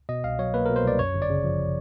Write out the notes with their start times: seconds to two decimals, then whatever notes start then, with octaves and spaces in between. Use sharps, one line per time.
0.09 B2 D#5
0.24 C2 F5
0.39 F#3 C#5
0.54 A#3 B4
0.66 B2 A#4
0.76 C5
0.84 C2 D5
0.99 F#2 C#5
1.14 G1
1.22 D5
1.30 C#3
1.44 F3